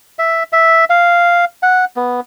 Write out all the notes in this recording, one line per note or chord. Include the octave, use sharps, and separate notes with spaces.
E5
E5
F5
F#5
B3